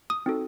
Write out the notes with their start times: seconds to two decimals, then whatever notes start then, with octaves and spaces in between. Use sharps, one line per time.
0.10 D#6
0.26 C4 D#4 F#4 A4